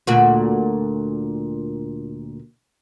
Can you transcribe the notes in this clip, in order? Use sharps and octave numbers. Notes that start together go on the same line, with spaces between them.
D2 A#2 F#4